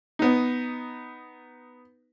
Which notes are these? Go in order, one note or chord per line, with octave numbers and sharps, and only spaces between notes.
B3 D#4